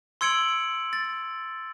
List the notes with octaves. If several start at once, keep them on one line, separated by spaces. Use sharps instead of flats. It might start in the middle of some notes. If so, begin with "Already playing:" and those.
C6 E6 G#6 C#7 D7 F#7
A6